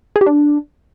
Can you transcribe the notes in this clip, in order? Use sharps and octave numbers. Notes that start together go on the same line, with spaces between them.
G#4
G4
D4